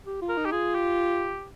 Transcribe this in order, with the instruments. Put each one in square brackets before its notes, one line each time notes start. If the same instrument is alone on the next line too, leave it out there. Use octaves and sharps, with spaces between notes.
[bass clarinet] G4
F4
[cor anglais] A#4
[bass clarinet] D#4
[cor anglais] G4
[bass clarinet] F4 [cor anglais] G#4
[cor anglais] G4